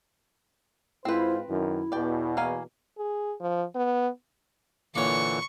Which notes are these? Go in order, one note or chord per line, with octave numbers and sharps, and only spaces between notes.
G#2 C4 E4 F4 B4 C5
F#2 D#3 E4
E2 B2 D5 G5
A#3 F5 G#5
G#4
F3
B3
A#2 D3 E3 A#3 C#5 C#6